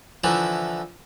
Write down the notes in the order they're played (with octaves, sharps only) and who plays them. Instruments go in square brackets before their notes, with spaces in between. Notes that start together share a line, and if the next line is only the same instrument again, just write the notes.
[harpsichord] D3 E3 F3 E4